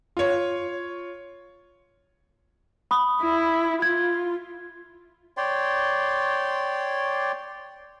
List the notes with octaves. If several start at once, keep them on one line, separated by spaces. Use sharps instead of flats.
F4 C#5
B5 D#6
E4
F4 G#6
C#5 D5 G5 C6